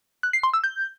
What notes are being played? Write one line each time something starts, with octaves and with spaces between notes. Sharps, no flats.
F#6
C7
C6
E6
G6